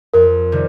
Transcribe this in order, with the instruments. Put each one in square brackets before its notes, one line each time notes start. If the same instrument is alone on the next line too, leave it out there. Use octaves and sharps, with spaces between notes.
[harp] F2 [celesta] A#4
[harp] C3 D#3 G3